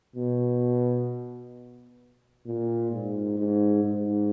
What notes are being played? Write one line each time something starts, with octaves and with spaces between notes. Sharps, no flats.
B2
A#2
G#2
G#2
G#2